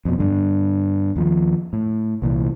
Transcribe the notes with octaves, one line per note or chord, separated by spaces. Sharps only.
F2 B2
G2 D3
D#2 F3
A2
C2 A#2 E3